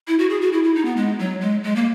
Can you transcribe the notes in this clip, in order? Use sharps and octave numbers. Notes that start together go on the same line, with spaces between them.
E4
F#4
G#4
F#4
E4
E4
D#4
B3
G#3
F#3
G#3
G#3
A#3